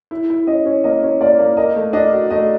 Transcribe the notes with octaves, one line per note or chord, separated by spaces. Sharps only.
E4
E4
C#4 D#5
C#4
A#3 D#5
C#4
A#3 D5
A#3
A#4 D#5
A3
D4 D#5
F#4
A3 D#5